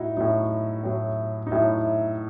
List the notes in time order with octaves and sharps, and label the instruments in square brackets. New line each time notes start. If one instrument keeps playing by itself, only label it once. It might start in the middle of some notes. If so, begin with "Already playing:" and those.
Already playing: [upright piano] A2 D#4 E4 F#4
A2 F#3 D#4
A2 F#3
D#4
A2 F#3 E4